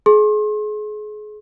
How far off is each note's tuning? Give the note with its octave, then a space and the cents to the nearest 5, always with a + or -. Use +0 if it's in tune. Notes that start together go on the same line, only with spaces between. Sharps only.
G#4 +30 C6 +40